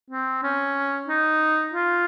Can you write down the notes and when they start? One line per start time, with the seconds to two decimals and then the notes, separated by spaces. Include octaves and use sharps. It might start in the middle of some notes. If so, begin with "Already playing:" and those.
0.10 C4
0.43 C#4
1.08 D#4
1.74 F4